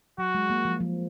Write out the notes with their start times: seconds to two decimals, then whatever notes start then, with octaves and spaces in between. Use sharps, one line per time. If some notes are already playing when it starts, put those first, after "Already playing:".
0.18 F#3 F#4
0.35 G#3
0.50 A#3
0.65 F3
0.80 F3